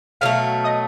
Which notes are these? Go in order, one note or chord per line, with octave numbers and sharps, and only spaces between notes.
B2 F#3 A3 F5 F6
D#5 D#6